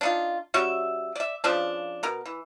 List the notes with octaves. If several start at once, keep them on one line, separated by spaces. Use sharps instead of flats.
D4 D#4 F4
G3 C#4 F#4 E5
D5 E5
C#3 F3 C#4 D4
B2 A#4
E3